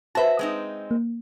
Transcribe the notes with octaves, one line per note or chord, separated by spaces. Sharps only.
F#4 B4 C5 E5 A5
G#3 C4 D#4
A#3